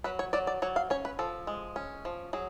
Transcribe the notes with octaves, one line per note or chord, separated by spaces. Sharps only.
F#3 B4
C#5
F#3 D5
D5
F#3 C#5
F5
C#4 C#5
B4
F3 A4
G#3
C#4
F3
F#3 G#4